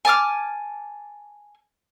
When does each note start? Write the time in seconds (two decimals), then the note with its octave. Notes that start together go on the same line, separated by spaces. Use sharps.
0.05 G#5 A5 D6 F6